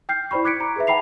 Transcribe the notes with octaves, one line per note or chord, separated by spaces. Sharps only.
G5 F6 G6 C7
E4 C5 D5 B5 C#6
D6 F#6 G#6 B6 C#7 D7
A#5
G#4 B4 E5
F#5 G5 A5 B5 C7 F7